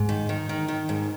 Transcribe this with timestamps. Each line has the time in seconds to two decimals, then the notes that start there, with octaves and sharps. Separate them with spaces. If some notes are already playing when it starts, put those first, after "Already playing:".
Already playing: G#2
0.09 D#3
0.29 D#3
0.49 D#3
0.68 D#3
0.89 G#2